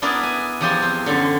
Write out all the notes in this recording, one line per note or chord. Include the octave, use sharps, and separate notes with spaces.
B3 D4 E4 G#4 A#4 B4
G#5
E2 F3 G4 G#5 A5 C6
C4
F#2 D3